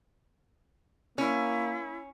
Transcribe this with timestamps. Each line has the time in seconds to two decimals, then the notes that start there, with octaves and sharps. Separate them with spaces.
1.18 A#3 C#4 E4